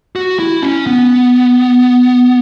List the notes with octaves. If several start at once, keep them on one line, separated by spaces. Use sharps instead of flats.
F#4
E4
C#4
B3